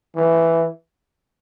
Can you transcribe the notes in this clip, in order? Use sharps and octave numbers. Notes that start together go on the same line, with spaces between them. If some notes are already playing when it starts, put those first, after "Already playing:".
E3